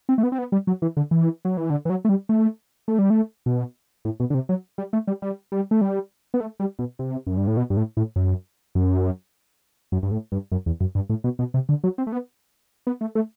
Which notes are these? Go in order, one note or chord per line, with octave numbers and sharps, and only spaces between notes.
C4
A3
B3
C4
B3
G3
F#3
E3
D3
E3
F#3
E3
D3
E3
F#3
A3
G3
A3
A3
G3
A3
B2
A2
B2
D3
C3
F#3
G3
A3
G3
G3
G3
A3
G3
B3
A3
G3
B2
C3
F#2
G2
A2
B2
G2
A2
A2
F#2
F#2
F#2
G2
A2
G2
F#2
E2
F#2
G2
A2
B2
B2
C3
D3
F#3
C4
A3
B3
B3
A3
A3